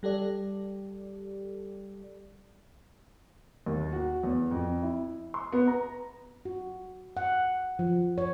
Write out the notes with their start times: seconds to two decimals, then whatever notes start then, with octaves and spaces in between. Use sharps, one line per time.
0.03 G3 G4 A4 D5
3.66 D#2
3.92 F#4
4.23 E2
4.51 F2
4.82 E4
5.34 C6
5.53 B3
5.67 A#5
6.45 F#4
7.17 F#5
7.79 F3
8.18 C#5